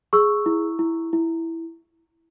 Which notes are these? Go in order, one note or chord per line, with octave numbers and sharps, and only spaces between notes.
G#4 C#6 E6
E4
E4
E4